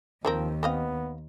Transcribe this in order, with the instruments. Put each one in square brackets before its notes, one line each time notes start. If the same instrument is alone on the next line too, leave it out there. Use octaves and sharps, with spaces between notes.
[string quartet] D#2 [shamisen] D#3 C4 A#4 [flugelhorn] F3
[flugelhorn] B3 [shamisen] C4 D#5 F5